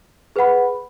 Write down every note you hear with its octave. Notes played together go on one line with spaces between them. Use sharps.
G#4 B4 F#5 B5